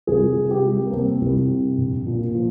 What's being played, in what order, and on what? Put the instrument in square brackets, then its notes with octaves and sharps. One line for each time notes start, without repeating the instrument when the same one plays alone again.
[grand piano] C2 G#4
C3
G4
G3
A#3
C2 C4
C2
C3
A#1
A#2
F3